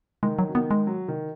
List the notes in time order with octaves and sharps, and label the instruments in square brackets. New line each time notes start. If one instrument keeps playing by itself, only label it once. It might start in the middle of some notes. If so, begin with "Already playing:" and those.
[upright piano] D#3 [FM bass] G#3
[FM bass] F#3
[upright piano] F#3
[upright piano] D#3 [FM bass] B3
[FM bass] G#3
[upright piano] F#3
D#3